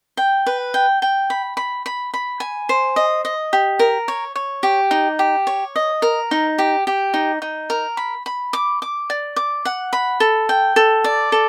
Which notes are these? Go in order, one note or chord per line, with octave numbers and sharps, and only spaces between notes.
G5
B4
G5
G5
B5
B5
B5
B5
G#5
C5
D#5
D#5
G4
A#4
C#5
C#5
G4
D#4
G4
C#5
D#5
A#4
D#4
G4
G4
D#4
D#4
A#4
B5
B5
D6
D6
D5
D6
F#5
B5
A4
G5
A4
D5
A4